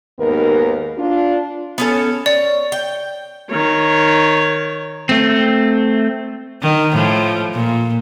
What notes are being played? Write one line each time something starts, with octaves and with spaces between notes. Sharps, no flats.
D#2 G#2 B3 A#4
D4 F4
B3 C#4 A4
C#5 D5
G5
D#3 C#5
A3 C4
D#3
A2 F3
A#2